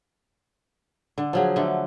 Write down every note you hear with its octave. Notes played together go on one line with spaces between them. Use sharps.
D3
F3 F#3 G#4
D3 A3